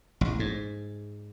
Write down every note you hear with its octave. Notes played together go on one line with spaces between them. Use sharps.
A1
G#2